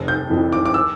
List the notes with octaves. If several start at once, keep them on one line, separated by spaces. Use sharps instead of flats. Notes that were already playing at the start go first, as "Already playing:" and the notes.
Already playing: F1
G6
F2 E3
D6
D6
E6